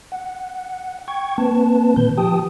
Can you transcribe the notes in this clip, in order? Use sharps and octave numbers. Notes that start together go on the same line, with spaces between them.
F#5
G5 C#6 G#6
A#3 C4 B4 A5
A#2 D#3 B4 G6
F3 G4 G5 A5 D#6